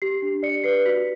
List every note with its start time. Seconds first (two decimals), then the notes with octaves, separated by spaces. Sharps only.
0.02 G4 C7
0.22 D4
0.43 D5 C#7
0.64 B4 C7
0.85 F#4 B6